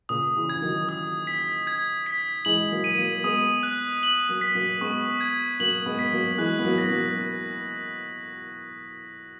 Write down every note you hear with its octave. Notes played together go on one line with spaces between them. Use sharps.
A#2 C#3 D#6
C#3 E3
G#6
E3
D#3 F#3
D#6
B6
G#6
B6
E3 G#3 F#7
F#3 A#3
D#7
F#3 A#3
G#3 B3 D#6
F#6
F#7
F#3 A#3
B6
F#3 A#3
G#3 B3 C#6
G#6
F#3 A#3 F#7
G#3 B3
B6
F#3 A#3
E3 G#3 F#6
B3
F#3 A#3
A#6
F#3 A#3